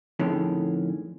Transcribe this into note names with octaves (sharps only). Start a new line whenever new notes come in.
F2 A2 D3 D#3 G#3 C#4